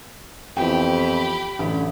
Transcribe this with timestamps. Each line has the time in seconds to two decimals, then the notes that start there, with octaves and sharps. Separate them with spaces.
0.57 F2 E3 B3 G4 G5 B5
1.59 A1 F#2 D3